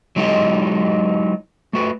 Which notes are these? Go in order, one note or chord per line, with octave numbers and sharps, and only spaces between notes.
F#3 G#3 D#4 E4 G4 D#5
A3 F#4 B4